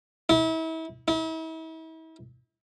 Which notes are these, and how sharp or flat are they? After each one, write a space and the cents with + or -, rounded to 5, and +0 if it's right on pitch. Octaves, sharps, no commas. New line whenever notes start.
E4 -35
E4 -40